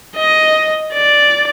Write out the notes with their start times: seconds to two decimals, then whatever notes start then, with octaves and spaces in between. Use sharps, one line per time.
0.17 D#5
0.94 D5